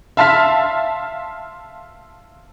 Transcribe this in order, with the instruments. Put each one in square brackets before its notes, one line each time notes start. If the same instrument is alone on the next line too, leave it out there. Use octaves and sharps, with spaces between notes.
[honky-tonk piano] E5 F5 A5 C6 F6 B6